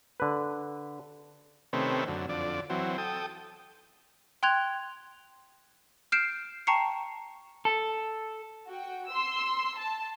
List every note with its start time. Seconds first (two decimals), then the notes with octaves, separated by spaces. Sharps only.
0.20 D3 B4
1.73 C3 D#3 A3 C4 C#4 B4
2.08 F#2 D3
2.29 F2 D3 D5
2.70 E3 F#3 C4
2.98 A4 G5 D#6
4.43 G5 C6 F#6 G#6 F7
6.12 F6 G6 C7 D7 E7
6.67 G5 A5 A#5 C#6 C7 C#7
7.65 A4
8.67 F#4 G5
9.07 C6 E6
9.78 A5